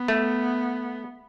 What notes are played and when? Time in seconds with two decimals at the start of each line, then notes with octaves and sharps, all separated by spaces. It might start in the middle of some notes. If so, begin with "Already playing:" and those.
Already playing: B3
0.08 A3